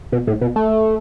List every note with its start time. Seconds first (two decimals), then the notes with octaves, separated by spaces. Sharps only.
0.12 B2
0.27 A2
0.41 B2
0.56 A3